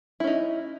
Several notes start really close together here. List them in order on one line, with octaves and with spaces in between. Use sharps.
E4 C#4 D#4